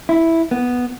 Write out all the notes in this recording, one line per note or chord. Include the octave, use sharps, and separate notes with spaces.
E4
B3